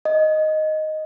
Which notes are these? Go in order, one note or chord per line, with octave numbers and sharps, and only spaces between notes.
D#5